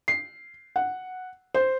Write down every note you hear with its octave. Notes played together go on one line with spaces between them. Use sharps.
C7
F#5
C5